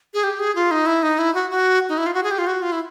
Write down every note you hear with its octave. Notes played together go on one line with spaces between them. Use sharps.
G#4
G4
G#4
F4
D#4
E4
D#4
E4
F#4
F#4
D#4
E4
F4
F#4
G#4
G4
F4
F#4
F4
E4